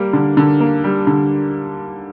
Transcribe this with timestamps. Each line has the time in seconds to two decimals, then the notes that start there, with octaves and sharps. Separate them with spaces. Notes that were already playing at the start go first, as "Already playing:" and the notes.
Already playing: G3 A#3
0.13 D3
0.37 D3
0.60 A#3
0.84 G3
1.07 D3